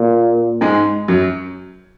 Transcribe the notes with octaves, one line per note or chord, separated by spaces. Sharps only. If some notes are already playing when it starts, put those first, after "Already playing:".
Already playing: A#2
G#2 G#3
F#2 F#3